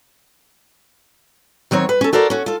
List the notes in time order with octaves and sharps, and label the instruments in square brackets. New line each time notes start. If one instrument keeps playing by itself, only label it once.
[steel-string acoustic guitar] D#3 F#3 C4 C#5
B4
C#4 A4
F#4 A4 A#4 C5 D5
C#4 F#4
F4 A4